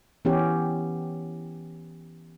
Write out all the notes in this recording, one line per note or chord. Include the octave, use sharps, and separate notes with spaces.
E3 B3 C#4 G4